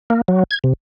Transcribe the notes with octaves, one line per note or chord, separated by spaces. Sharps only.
A#3
F#3
G#6
C3